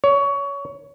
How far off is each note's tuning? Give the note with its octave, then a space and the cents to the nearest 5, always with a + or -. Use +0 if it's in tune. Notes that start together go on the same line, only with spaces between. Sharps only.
C#5 +20